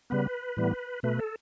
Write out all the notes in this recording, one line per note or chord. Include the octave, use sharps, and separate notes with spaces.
C#3 G3 B3 B4
A2 E3 G3 B3
B2 A3 B4
A4